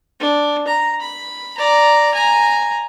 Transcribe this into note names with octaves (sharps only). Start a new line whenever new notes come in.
D4
A#5
B5
D5 A#5
G#5 A#5